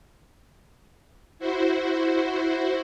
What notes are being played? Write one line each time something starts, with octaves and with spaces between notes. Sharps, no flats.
E4 F#4 C5